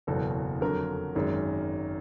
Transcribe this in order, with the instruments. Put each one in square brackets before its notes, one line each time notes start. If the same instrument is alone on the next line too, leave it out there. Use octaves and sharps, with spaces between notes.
[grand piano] F#1 E2 B2 F#3 A4
F2 D3 F#3 A#4
G#1 F#2 D#3 G#3